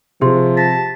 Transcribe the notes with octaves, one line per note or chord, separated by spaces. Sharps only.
C3 F3 G#4 C5 C6
A5 A#6 B6